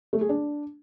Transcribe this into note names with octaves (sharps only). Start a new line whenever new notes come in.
A3
G#4
D4